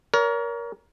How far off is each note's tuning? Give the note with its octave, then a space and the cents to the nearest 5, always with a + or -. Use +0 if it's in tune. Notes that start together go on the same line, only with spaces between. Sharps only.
A#4 +15 C#5 +40